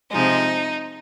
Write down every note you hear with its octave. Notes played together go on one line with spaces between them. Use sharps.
C3 F3 G#3 D#4